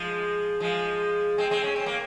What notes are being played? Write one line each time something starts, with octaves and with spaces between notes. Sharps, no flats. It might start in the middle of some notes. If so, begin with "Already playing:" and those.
Already playing: F3 G#3
F3 G#3
G#3 C4
G#3 C4
C#4
C4
A#3